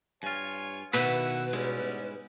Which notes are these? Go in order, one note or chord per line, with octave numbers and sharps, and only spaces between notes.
G2 F4 C#5 G#5
B2 D#3 E4 B4 F#5 B5 E6
G#2 G3 G#3 C#4 E4